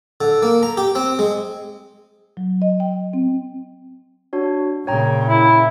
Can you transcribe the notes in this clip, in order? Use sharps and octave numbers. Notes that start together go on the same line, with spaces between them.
D3
A#3
A#5
G4
C4
G#3
F#3
D#5
G5
C4
D4 F#4 C#5
A#2 C#3 C#5 G5 A#5
E4